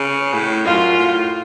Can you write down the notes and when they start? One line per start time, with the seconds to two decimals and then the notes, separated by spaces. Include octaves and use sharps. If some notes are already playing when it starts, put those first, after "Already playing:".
Already playing: C#3
0.34 A2
0.66 F#2 F4
0.98 A2